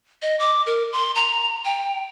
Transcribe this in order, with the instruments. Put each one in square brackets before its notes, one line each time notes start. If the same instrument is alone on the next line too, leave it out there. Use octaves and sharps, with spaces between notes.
[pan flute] D#5
D6
A#4
C6
A#5
G5